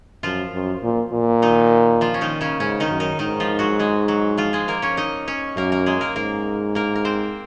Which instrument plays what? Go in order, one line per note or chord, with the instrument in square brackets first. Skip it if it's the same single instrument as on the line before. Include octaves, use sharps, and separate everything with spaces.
[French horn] F#2 [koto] F3 F4
[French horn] F#2
A#2
A#2
[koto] D#3 D#4
F3 F4
C#4
D#3 D#4
C#3 C#4
[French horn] G#2 [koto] C#3 C#4
[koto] D#3 D#4
[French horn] F#2
[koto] D#3 D#4
[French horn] G#2 [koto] D#3 D#4
[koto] F3 F4
F#3 F#4
G#3 G#4
F#3 F#4
F3 F4
G#3 G#4
A#3 A#4
C#4 C#5
D#4 D#5
C#4 C#5
[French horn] F#2 [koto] A#3 A#4
[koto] A#3 A#4
G#3 G#4
A#3 A#4
[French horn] G#2 [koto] A#3 A#4
[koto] A#3 A#4
A#4
C4 C5